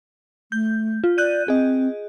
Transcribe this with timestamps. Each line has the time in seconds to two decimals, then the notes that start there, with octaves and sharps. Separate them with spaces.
0.52 A3 G6
1.04 F4
1.18 D5 F#6 G6 D#7
1.48 C4 G#4 D#5